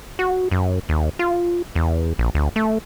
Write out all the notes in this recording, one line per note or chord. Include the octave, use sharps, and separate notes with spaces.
F#4
F#2
D#2
F4
E2
A#1
D2
A3